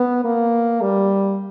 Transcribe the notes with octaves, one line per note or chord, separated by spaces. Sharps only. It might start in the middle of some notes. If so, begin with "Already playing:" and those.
Already playing: B3
A#3
G3